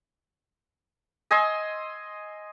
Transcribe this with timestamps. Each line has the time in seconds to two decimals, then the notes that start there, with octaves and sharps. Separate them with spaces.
1.31 D#5 G#5 C6 E6